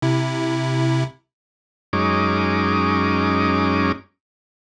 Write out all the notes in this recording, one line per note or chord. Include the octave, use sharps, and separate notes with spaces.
C3 E4
F#2 G#3 C#4 D#4 D6